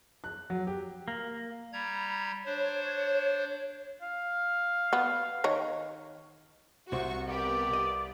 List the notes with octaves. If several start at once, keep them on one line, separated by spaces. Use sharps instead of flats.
F#6
F#3
G4
A#3
G3 A#5 B5 G#6
D4 C5 C#5
F5
B3
D#3 C#5 A#5
C2 C3 C4 F#4 C5 C#6
B3 G4 A#4 D5
D#5